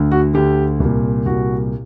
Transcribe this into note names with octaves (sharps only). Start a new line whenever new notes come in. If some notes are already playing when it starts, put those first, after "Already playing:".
Already playing: D2 D3
F#4
D2 D3 G4
C2
A#2
C2 A#2 F#4